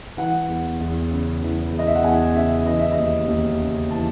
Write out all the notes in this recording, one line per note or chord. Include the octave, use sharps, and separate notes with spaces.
E3 F#5
E2
E2
C#3
E3
E2
D#5
E5
F#5
E2 G#5
C#3 E5
E3 D#5
E5
D#5
D#2
D#2
C#3
E3 A5